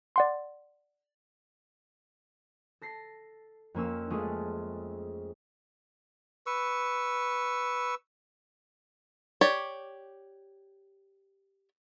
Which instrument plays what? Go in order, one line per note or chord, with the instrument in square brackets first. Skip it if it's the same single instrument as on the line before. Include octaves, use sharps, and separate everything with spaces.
[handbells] D5 F#5 C6
[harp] A4 A#6 C7
F2 A#3 C#4 E6
G#3 A3 C#4 F4 G#4 A4
[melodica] B4 C#6 E6
[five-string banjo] G4 C#5 D5